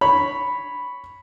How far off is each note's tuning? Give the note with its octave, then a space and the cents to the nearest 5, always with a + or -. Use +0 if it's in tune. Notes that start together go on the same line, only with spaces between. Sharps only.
C#5 +0 B5 +0